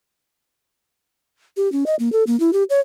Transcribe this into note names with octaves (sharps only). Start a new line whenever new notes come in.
G4
C#4
D#5
A#3
A4
A#3
E4
G4
C#5